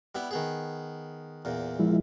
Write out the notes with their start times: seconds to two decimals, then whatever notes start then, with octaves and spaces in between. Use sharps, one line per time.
0.15 G3 B3 E4
0.31 D#3 B3 G#4
1.45 E2 A#2
1.79 F3 G#3 E4